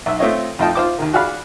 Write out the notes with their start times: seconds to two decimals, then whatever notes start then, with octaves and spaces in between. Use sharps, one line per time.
0.06 B1 E5
0.19 A3 C4 F4 C#5 D#5
0.59 F2 A2 F4 D#5 G5 A5
0.75 F4 C5 D6
0.98 D#2 D#3
1.13 F#4 G#4 D5 F5 B5